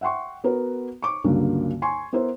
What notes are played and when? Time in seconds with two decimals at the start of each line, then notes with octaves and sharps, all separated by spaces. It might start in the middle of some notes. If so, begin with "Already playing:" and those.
0.01 E5 F#5 G5 C6 C#6
0.44 B3 F#4 A#4 B4
1.02 C#6 D6
1.24 C#2 G2 D3 F#3 A#3
1.82 G#5 C6 C#6
2.13 B3 E4 A#4 C5